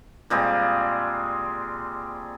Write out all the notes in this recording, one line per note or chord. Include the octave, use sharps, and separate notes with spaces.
A#2 G3 G#3 C4